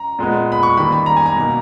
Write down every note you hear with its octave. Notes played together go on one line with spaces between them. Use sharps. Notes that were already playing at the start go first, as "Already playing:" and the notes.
Already playing: A#5
A#2 G#3 B3
B5
C#6
D#3 G3 A#3 B5
B5
A#5
G#5
A#5
B2 A#3